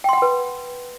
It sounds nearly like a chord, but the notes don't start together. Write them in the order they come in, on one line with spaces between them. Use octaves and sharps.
G5 C6 F#5 B5 B4